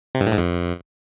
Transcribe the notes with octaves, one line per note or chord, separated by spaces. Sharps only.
C3
G2
A2
G#2
F2